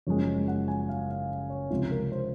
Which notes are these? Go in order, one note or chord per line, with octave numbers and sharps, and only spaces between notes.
F#1 F#2 F3 G#3 C#5
F#5
G#5
F5
F5
C#5
C#2 C3 F3 G#3 F4
A#4
C5